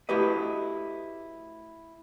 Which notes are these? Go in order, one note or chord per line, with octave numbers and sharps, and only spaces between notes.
A3 E4 F#4 G4 B4 D#5